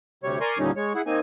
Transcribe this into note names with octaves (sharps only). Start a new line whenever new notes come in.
D2 C3 G3 C#5
A#4 D5 G#5 A#5 C6 C#6
D#2 A#2 D3 G3 C#4 D#4
G#3 C#5
E4 G#4 F#5
D#3 A#3 C4 D#4 G#5